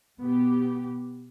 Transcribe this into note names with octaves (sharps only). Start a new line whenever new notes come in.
B2 B3 G4